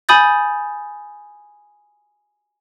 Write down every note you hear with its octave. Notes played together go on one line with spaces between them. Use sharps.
G#5 B5 D#6 G6 A6